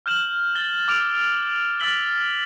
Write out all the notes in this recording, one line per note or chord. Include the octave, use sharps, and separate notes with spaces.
F6 G6 E7 F#7
A6 G7
D6 E6 F6 D7 F7 G7
E6 F6 A6 B6 F#7 G7